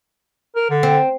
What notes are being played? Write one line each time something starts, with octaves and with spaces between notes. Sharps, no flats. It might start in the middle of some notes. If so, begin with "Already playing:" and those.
A#4
D3
C4